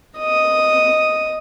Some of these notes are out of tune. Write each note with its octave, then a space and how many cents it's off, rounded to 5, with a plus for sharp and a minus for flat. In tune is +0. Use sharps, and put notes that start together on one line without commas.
D#5 +0 D#6 +0